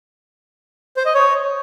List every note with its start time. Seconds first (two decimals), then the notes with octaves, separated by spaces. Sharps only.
0.97 C5
1.06 D#5
1.14 C#5